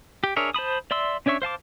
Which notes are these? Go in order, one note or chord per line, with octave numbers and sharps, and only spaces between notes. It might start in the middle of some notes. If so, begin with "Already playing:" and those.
G4
D4 G#4 A#4 C#5 E5
C5 A5 B5 D#6
D5 E5 C6 E6
C#4 D4 C#5 E5 C#6
C5 F5 A5 D6